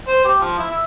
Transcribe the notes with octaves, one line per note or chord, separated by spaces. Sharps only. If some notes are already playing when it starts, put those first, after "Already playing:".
C5
G4
F3
E4
E5